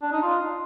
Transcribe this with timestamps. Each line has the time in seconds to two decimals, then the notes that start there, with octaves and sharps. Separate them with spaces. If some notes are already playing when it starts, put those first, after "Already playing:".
0.02 D4
0.12 D#4
0.22 F4